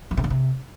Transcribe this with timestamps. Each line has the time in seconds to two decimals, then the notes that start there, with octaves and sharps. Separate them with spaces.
0.11 E3
0.17 C3
0.24 D3
0.30 C3